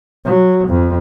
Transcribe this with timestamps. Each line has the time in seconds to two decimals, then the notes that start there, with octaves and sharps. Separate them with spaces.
0.25 F#3
0.68 F2